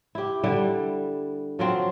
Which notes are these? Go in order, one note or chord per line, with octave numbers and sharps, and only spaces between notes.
E4 G4
D3 G3 E4
F3 F#3 C4